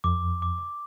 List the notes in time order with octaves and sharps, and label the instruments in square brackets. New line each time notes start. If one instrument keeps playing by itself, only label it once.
[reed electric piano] F2 [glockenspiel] D6
[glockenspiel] D6